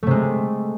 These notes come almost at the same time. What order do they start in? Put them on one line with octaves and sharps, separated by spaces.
A3 C3 G#3